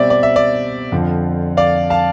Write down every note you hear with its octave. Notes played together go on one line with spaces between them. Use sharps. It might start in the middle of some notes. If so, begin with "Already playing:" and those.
Already playing: B2 G3 C4 D5 E5
D5
E5
D5
F2 D3 F3
D5 F5
F5 A5